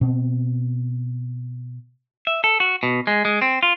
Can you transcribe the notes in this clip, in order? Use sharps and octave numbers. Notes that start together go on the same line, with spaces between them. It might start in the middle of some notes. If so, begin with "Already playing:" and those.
B2 C4
E5
A4
F#4
B2
G#3
G#3
C4
F4